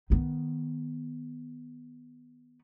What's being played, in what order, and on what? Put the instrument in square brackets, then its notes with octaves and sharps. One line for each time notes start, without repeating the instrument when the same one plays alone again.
[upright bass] D#3 B3